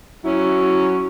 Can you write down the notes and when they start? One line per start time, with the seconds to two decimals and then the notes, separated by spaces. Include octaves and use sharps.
0.25 F#3 C#4 E4